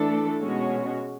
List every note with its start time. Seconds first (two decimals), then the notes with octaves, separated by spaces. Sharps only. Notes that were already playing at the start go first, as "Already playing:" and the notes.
Already playing: E3 A3 D4 A4
0.41 B2 G#3 C#4 F#4